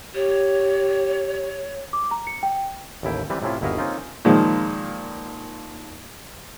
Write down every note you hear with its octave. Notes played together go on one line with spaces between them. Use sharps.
G4 C#5
D6
A#5
C#7
G5
A1 D#2 E4 G5
E3 G3 C4 B4
A2 C3 C#4 E4 F4
G1 D#2 E4 F#4 D#5 F5
A#3 C4 C#4 D#4 F4
A#2 D#3 F3 G#3